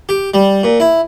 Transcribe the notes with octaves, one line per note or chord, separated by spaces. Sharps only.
G4
G3
A#2
E4